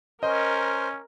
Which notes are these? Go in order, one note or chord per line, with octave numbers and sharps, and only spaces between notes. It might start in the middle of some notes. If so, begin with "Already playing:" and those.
C#4 A#4 C5 D#5